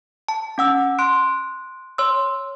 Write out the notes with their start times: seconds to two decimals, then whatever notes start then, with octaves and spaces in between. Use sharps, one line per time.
0.28 A5
0.58 C#4 F#5 E6
0.99 C6 F#6 D7
1.98 C#5 C6 E6